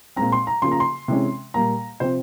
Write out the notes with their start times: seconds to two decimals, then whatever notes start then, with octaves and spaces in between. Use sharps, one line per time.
0.16 A#2 G#3 C4 A#5
0.32 C6
0.47 A#5
0.62 C#3 F3 A#3 C6
0.72 A#5
0.80 C6
1.08 C3 E3 G#3 C#4
1.54 A#2 G3 A#3 A#5
2.00 C3 F3 C4 C5